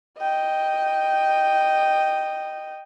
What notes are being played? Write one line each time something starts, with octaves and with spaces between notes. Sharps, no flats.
D#5 G5